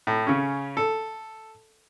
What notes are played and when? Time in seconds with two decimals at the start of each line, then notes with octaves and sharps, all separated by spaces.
0.07 A2
0.27 C#3 C#4
0.77 A4